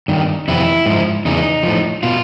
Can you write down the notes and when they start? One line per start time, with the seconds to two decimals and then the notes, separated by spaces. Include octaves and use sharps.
0.08 G2 D#3
0.48 F2 C3 E3 E4
0.86 G#2 F3
1.25 E2 C#3 E3 D#4
1.63 A2 F3
2.03 B2 F4